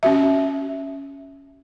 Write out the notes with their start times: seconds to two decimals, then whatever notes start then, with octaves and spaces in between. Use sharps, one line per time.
0.03 C#4 F#4 E5